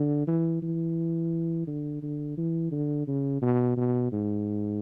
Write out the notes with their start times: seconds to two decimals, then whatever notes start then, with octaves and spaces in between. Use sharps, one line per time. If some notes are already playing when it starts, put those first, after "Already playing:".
Already playing: D3
0.27 E3
0.62 E3
1.67 D3
2.02 D3
2.37 E3
2.71 D3
3.07 C#3
3.42 B2
3.77 B2
4.12 G#2